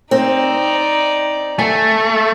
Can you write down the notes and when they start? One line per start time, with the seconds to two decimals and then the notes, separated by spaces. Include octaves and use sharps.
0.11 C4 D#4 D5
1.59 A3 G#5